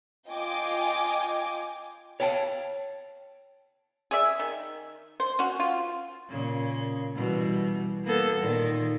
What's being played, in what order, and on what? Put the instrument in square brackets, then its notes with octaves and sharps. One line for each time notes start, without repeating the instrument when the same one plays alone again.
[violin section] F4 D#5 G5 G#5 D6
[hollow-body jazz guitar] C#5 F5 G5 A5
[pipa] G#4 D5 E5
D#3
C5
C#4 F#4
F4
[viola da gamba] A#2 C#3
B2 E3 G3
A#3 B3 A4
A#2 D#3